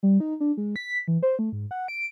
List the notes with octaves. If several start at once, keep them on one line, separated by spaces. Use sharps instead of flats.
G3
D#4
D4
G#3
B6
E3
C5
A3
G#2
F#5
D7